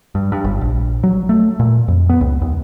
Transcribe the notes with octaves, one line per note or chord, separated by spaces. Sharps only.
G2
G2
G1
A#1
F#3
A3
A#2
F2
B3
C#2
D#2